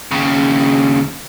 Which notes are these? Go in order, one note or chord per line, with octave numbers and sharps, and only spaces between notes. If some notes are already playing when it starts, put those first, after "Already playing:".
D#2 C#3